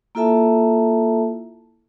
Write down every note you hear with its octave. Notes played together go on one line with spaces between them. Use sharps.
A#3 E4 F4 A4 E5 A5